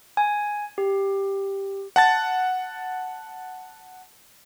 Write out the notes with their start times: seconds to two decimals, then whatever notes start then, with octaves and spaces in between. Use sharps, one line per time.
0.17 G#5
0.78 G4
1.96 F#5 A5 A6